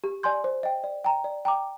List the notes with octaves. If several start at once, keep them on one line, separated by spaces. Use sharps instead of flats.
G4
D5 G#5 C6 G6
C5
D#5 G5
D5
G5 A#5
D5
G5 A#5 D6